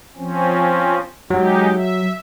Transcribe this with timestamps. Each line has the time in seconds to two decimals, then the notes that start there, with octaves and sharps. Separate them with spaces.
0.16 F3 C4 C#4
1.30 F#3 G#3 D#4 G4
1.75 E5